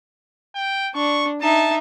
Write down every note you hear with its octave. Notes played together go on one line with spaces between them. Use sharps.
G5
D4 C#6
D#4 E5 A5